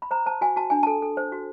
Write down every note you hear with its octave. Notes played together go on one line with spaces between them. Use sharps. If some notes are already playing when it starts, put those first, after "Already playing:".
B5
C5 A#5
C5 A5
F#4 G#5
F#4 A5
D4 G#5
A4 A5
A4
C5
F#4